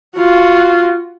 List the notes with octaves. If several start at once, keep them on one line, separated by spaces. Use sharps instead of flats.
F4 F#4